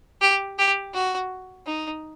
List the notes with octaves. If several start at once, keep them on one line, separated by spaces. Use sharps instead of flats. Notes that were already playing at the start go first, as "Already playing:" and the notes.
G4
G4
F#4
D#4